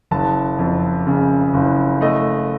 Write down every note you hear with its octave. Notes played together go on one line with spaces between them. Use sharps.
F#1 A5
F2
C#3
F#1
A3 D#5